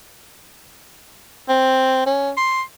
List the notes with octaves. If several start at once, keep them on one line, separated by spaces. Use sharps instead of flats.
C4
C#4
C6